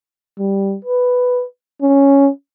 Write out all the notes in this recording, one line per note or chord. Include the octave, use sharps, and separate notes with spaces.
G3
B4
C#4